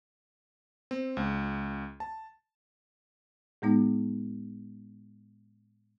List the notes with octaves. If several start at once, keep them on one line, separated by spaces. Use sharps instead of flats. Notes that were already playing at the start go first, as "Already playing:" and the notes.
C4
C#2
A5
A2 G#3 B3 D#4